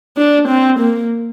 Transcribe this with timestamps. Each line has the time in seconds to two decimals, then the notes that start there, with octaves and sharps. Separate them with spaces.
0.17 D4
0.48 C4
0.80 A#3